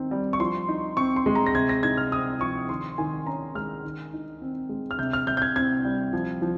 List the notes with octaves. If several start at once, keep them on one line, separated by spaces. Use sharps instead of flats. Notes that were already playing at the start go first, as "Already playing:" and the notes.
Already playing: D#3 C4 D#4
G3
C#6
F3 C6
D#4
C4 C#6
C6
G#3
A#5
A#6
C3 G#6
A#6
D#4 G#6
F6
C4 D#6
F3 C#6
D#3 C6
D#3 G#5
C#4 A#5
G#3 F6
D#3
D#4
C4
G#3
F6
C3 G6
F6
C3 G6
G6
G#6
C4 G#6
G3
F3
F3